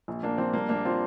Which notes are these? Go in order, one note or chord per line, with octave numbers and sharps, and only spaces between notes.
A#1
A#1 A#3 D4
F3 C4
G3 A#3 D4
A#1 A#3 D4
C4 F4